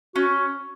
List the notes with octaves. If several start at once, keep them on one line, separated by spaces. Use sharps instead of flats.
C#4 F#4